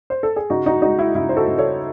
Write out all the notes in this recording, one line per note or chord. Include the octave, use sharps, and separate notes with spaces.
C5
A4
G#4
C#3 D#4 F#4
D#4 F#4
G#3 D#4 F#4
E4
C#3 E4
C5
F#4 A4
C#3
A4 C#5